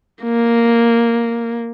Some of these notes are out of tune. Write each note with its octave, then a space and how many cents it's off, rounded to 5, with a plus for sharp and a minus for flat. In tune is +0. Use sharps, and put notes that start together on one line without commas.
A#3 +0